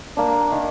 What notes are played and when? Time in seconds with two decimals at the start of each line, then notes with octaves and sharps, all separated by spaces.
0.17 A#3 D4
0.52 D#3